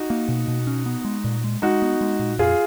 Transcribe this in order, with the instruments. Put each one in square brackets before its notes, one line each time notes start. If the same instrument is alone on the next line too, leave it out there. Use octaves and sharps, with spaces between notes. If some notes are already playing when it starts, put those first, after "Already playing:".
Already playing: [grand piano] D#4 F#4
[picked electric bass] A#3
B2
B2
C#4
B3
G#3
A#2
G#3
[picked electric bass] G#3 [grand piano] D#4 F#4
[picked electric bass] B3
G#3
A#2
[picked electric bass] F2 [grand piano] F4 G#4